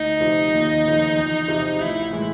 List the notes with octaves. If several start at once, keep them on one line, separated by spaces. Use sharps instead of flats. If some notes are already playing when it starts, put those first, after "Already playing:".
Already playing: D2 D#4
C3 F3
D#2
C#3 F3
E2
C3 F3
A1 E4
A2 E3 G#3